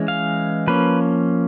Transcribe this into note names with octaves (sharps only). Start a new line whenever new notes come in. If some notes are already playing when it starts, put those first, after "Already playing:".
Already playing: E3 G#3 C#4
F5
F3 A#3 C#4 B4